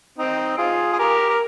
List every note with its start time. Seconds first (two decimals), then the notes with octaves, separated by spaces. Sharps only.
0.18 C4 D#4
0.58 F4 G#4
0.93 G#4
0.99 G4 A#4
1.29 A#4